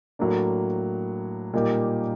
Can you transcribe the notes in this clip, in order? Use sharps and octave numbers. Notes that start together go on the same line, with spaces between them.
A2 F#3 A#3 D4
A#2 G3 A#3 D#4 G4